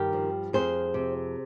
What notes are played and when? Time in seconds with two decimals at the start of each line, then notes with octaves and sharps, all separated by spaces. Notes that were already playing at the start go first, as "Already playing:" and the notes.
Already playing: G2 D#3 G4 A#4
0.13 F3
0.53 F2 G#4 C5
0.94 C3